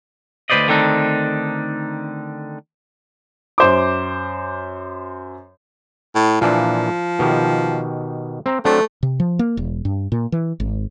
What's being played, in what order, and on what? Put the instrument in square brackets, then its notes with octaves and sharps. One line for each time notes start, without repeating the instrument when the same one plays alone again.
[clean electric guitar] D2 C3 B4 C5 D5 D#5
D3 D#3 A3 C4 D4 D#4
[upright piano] F#2 C5 D6
[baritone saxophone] A2
[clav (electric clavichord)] A#2 E3 D4 [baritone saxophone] F3
[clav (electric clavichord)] B2 D#3 G4
C4 A#5
[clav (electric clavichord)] F#3 C4 D4 [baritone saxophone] A3
[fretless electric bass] C3
F3
A#3
E1
G2
A#2
E3
G#1